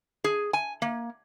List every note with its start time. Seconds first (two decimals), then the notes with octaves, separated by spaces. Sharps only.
0.24 G#4
0.53 G#5
0.82 A#3